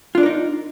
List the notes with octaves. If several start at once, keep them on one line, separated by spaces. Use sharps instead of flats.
D4 D#4 F4 A#4 D5